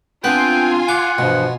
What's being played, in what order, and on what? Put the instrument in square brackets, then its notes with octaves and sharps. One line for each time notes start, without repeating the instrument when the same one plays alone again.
[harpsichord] B3 B4 [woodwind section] C4 D4 [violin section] F4 G#5 [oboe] G5
[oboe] F#5 [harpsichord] D6
[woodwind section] G2 E3 F3 [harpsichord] B2